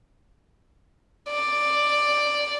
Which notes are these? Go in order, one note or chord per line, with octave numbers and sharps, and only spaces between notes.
D5